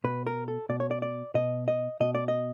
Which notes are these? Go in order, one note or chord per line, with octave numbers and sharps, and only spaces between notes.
B2 B4
A#4
A4
B2 D5
C#5
D5
D5
B2 D#5
D#5
B2 D#5
D5
D#5